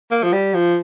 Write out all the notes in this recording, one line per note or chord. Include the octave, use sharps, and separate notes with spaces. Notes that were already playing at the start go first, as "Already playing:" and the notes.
A#3
F3
G3
F3